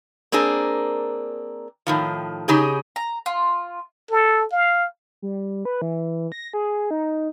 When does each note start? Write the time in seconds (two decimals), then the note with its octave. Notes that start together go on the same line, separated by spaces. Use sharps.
0.32 A#3 C4 D4 G#4 A#4
1.87 A2 D#3 F3
2.48 C#3 D#4 G4 G#4
2.96 A#5
3.26 F4
4.11 A4
4.52 F5
5.22 G3
5.65 B4
5.82 E3
6.32 A#6
6.54 G#4
6.91 D#4